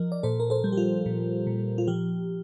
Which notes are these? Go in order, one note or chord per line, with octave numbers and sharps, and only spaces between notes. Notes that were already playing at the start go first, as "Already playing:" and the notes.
Already playing: F3 A#4 D#5
D5
A#2 A4 C5
A#4
A4 C5
G3
G4
F4
A#2
A#2
F4
F3 G4